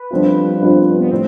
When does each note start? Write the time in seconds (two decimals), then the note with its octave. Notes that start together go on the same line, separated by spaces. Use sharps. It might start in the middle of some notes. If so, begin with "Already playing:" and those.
Already playing: B4
0.11 G1 G2 F3 C4 F4
0.61 G1 G2 F3 C4 F4
1.00 B3
1.11 A2 C4